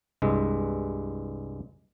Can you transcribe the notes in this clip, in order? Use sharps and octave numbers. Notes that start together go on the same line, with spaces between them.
C2 G2 G#3